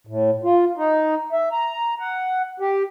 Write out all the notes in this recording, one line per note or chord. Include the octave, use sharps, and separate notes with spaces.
A2
F4
D#4
E5
A#5
F#5
G4